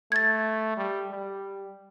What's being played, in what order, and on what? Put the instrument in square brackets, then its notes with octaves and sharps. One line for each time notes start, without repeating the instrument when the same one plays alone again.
[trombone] A3 [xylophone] G#6 A6
[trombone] G3
G3